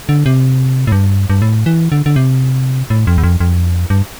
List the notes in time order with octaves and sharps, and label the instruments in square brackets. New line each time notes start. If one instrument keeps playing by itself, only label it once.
[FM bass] D3
C3
A2
G2
G2
A2
E3
D3
D3
C3
A2
F2
E2
F2
F2
G2